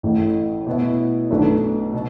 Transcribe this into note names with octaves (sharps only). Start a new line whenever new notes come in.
A1 A2 A3
B2 B3 E4
B1 B2 A3 D4 B4
B2